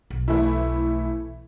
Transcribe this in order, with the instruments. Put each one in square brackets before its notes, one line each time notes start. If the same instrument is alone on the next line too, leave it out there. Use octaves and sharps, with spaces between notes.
[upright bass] B1
[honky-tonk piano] E3 A3 E4